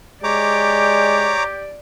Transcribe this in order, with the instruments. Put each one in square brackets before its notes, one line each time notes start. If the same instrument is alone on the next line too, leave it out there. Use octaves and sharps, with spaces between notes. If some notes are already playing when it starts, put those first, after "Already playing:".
[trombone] G#3 [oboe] G4 [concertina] C#5 A#5 D6 [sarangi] D5